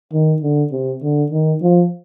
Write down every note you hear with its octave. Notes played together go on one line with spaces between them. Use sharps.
D#3
D3
C3
D3
D#3
F3